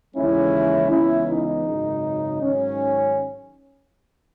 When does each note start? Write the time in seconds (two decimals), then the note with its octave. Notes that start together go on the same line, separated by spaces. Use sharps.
0.14 D#2 C#3 E3 G#3 C#4 E4
0.90 C#2 C#3 E3 B3 C#4 E4
1.28 D#4
1.66 G#1 F#2 C#3
2.42 G#2 D#3 F#3 C#4